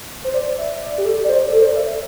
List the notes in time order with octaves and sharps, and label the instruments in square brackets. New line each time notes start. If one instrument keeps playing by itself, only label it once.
[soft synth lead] C5
D5
E5
D5
G4
A4
D5
C5
D5
A4
C5
D5
E5